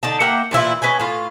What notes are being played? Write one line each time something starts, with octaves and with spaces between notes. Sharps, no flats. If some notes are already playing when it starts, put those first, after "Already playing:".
D3 D#4 A5
A#3 E5 F#5 G5
A#2 E3 E4 F4
C#4 B4 D#5 G#5
A2 F4